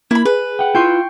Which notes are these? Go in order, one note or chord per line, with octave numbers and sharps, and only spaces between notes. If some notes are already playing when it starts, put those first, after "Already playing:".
A#3 E4 B5
G#4 B4
F#5 G5
E4 F4 G5 C6 C#6